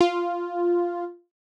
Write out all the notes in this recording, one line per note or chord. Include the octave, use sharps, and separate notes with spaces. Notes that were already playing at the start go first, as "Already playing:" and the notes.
F4